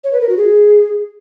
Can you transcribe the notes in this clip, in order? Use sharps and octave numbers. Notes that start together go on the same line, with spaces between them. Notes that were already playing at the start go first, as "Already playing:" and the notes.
C#5
B4
A#4
F#4
G#4